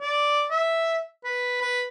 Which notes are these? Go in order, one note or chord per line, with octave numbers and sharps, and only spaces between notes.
D5
E5
B4
B4